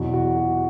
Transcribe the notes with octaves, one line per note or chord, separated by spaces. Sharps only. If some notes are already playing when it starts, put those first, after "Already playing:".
Already playing: E2 B2 F#3 F#4
F#4
F#4